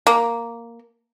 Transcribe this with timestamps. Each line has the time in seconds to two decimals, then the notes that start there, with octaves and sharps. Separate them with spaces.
0.07 A#3